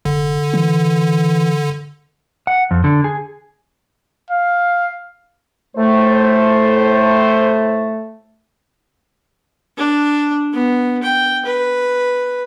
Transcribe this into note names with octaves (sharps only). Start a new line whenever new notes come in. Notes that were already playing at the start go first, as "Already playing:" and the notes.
F1 D3
E3
F#5
F2
D3
G#4
F5
A2 A3 C5
D4
B3
G5
B4